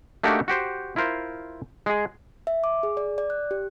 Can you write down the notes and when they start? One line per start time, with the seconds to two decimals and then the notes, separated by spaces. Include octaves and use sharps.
0.23 A3 A#3 D4 D#4 F#4 G4
0.48 F#4 G4 C5
0.96 E4 F4 A#4 C5
1.86 G#3 G#4
2.47 E5
2.64 D6
2.83 G#4
2.97 D5
3.18 D5
3.30 F#6
3.51 G4